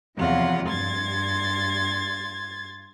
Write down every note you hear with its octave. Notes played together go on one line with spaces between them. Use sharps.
E2 C3 F3 F#3 F4 F#5
G2 C6 G#6 A6